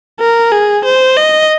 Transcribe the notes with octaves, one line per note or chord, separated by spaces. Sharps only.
A#4
G#4
C5
D#5